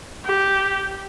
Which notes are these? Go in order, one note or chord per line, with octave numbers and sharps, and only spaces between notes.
G4